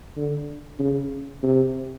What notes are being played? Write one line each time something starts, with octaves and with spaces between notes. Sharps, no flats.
D3
C#3
C3